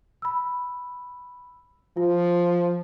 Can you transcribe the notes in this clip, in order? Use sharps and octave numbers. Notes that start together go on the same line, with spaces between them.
B5 E6
F3 F4